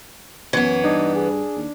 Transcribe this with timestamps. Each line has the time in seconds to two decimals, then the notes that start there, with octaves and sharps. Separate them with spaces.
0.53 F#2 E3 B3 C#5
0.84 G2 D4 D#4
1.15 G#4
1.56 D#2